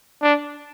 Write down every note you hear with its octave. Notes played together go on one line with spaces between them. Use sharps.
D4